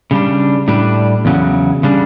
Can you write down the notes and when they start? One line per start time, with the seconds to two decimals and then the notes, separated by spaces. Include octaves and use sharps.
0.11 C#3 G3 D4
0.68 A2 G3 D4
1.25 E2 C#3 F#3
1.83 C#3 G3 D4